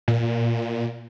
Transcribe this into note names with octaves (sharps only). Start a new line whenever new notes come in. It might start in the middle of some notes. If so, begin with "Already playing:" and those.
A#2